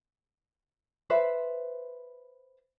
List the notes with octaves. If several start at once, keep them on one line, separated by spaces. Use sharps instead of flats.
B4 C5 E5